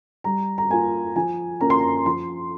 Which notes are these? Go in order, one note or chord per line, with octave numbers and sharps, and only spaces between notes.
G3 A#5
A#5
A#3 F4 G#5
F3 G#5
A#3 C#4 A#5
C6
A#5
F3 C6